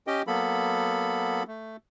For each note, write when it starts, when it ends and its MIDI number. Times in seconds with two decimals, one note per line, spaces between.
0.07 0.22 61
0.07 0.22 67
0.07 0.22 75
0.07 0.22 79
0.27 1.43 54
0.27 1.43 58
0.27 1.43 59
0.27 1.43 69
0.27 1.43 83
1.47 1.77 57